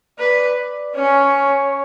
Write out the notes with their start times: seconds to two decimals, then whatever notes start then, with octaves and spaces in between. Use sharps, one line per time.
0.19 B4 D5
0.57 D5
0.95 C#4 C#5